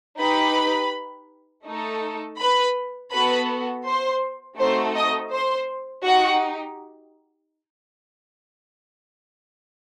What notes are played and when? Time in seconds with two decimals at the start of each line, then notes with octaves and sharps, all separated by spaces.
0.19 D#4 G4 B4 B5
1.66 A3 D#4 A4
2.39 B4 B5
3.12 B3 F#4 A4 B4 B5
3.86 C5 C6
4.59 A3 C4 D#4 F#4 A4 C5 C6
4.96 D#5 D#6
5.32 C5 C6
6.05 D#4 F#4 G4 F#5